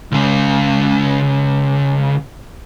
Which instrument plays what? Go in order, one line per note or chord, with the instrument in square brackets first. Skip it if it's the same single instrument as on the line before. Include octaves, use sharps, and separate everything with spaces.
[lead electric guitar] C#2 C#3